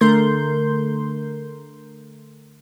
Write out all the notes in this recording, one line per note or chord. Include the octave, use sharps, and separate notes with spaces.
D3 A3 A#4 C6 G6